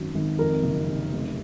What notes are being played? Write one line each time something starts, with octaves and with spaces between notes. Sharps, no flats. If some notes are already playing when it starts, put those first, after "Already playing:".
Already playing: G#1 F#2
G#1
F2 A#4
F#1
C3
F1